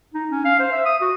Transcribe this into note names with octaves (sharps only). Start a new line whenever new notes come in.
D#4
C#4
F5
C5
E5
D#6
F#4